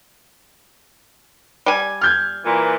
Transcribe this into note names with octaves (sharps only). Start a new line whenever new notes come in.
G3 G#5
F6 G6 G#6
A#2 E3